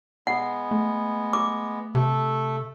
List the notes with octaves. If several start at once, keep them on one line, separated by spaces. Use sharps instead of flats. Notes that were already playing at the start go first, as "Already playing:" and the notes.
G#3 B3 F#5
A3
D6
C3 A3 A4